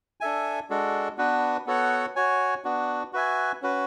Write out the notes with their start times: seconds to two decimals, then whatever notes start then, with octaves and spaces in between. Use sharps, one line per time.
0.21 D4 A4 E5 G#5
0.70 G#3 D4 F#4 A4
1.18 B3 D4 F#4 B4
1.66 B3 F#4 A4 C#5 F#5
2.16 F#4 C#5 G#5
2.64 B3 D4 F#4
3.13 F#4 B4 E5 G#5
3.62 C#4 F#4 B4